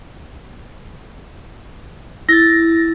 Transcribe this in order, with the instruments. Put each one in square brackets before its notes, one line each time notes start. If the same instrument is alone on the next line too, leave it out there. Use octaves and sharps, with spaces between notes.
[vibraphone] E4 [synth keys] A6 A#6